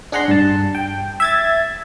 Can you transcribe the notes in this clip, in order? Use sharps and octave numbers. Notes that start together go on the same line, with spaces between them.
D4 G#4 F#5 A#5 C6
G2 A5
G5
E5 G#6 A6